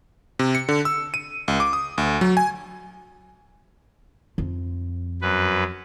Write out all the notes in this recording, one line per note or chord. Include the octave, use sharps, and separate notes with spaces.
C3
C#7
D3
E6
D#7
C#2
D6
D#6
D2
F#3
G#5
F2
F#2 B4